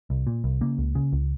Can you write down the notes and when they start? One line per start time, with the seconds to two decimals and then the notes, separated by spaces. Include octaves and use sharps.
0.10 C2
0.27 A#2
0.44 C2
0.61 C#3 A#3
0.78 C#2
0.95 C#3
1.13 C#2